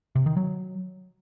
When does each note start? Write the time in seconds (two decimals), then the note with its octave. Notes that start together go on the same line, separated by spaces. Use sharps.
0.15 C3
0.26 D#3
0.37 F#3